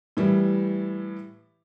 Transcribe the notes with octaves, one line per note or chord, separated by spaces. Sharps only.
A2 E3 G3